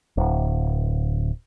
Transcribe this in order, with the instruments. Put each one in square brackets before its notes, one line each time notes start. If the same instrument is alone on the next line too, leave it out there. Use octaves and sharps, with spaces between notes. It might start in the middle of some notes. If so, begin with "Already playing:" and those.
[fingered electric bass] D1